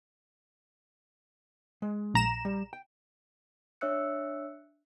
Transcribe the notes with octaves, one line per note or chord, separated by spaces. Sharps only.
G#3
A#1 A#5 E7
G3
G5
D4 C#5 E5 E6 F#6 C#7